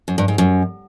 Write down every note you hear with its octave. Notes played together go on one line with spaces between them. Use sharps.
F#2
G2
G#2
F#2